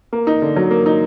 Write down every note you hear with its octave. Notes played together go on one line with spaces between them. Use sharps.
A#3
D#4
D3
F#3
A#3
D#4